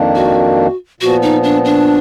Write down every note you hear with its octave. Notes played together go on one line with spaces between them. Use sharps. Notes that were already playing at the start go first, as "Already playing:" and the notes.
Already playing: F2 D#3 A#3 D4
F#4
A#2 F3 B3 F#4
D#4
D4
D4